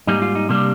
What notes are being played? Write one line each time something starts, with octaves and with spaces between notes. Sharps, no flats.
G#2 G3 A#3 D#4
F4
D#4
C3 G3 A#3 D4